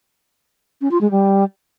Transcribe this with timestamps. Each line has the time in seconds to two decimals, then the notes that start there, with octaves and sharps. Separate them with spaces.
0.81 C#4
0.91 F4
1.01 G#3
1.11 G3